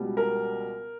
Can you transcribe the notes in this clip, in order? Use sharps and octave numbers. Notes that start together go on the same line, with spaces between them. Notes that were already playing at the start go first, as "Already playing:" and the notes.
Already playing: C#2 B2 G3
A#4